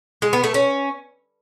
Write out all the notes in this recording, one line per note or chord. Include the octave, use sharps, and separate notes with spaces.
G#3
B3
A3
C#4